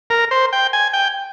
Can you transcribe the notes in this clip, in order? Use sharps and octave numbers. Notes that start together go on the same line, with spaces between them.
A#4
C5
G5
G#5
G5